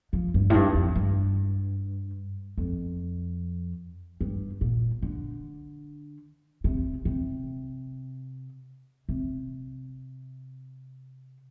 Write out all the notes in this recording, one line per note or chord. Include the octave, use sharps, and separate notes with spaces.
F3
G2
A2
G2
F2
G2
F2
G2
A#2
D3
C3
C3
C3